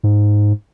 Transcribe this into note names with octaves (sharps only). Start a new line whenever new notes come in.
G#2